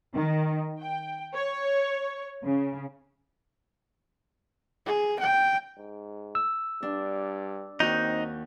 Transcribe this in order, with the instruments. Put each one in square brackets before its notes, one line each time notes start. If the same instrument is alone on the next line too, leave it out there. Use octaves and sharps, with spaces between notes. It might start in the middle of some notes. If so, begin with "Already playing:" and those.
[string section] D#3
G5
C#5
C#3
[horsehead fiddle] G#4
G5
[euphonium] G#2
[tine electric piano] E6
[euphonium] G2 [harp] D4
[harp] D#2 F#4 G6 [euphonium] C4 [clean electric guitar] D#4